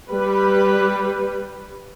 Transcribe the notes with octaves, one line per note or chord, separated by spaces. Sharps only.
G3 B4